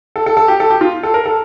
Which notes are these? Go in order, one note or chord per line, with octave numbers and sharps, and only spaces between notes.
A4
A4
A4
G4
A4
G4
F4
A4
A#4
A4